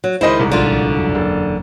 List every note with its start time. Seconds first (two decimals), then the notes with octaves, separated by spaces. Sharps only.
0.04 F#3
0.21 C#2 D#3 G#3 E4 C5 D#5 B5
0.39 C2 G#2
0.52 A#1 D3 F4
0.95 E1 F#2 F#3
1.15 F#1